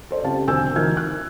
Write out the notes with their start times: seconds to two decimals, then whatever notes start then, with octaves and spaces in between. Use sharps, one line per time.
0.11 A4 C5 D5
0.23 C#2 C4 G4 F5 A5
0.47 E1 D3 C4 G#5 E6 G6
0.76 D2 E3 D#4 A#4 F6 G#6
0.97 F#6